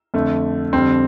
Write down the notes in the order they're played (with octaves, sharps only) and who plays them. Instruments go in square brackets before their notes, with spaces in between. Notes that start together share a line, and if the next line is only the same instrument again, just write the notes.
[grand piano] F2 D3 A3
F2 D3 G3 C4